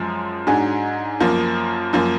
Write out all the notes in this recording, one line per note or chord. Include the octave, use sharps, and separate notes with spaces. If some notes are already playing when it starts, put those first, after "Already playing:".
Already playing: F#2 F3 G#3
G#2 F#3 D4 G#4
F#2 F3 A#3
F#2 F3 A#3